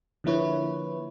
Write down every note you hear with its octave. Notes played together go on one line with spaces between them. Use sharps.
D3 F3 A#3 E4 B4 C#5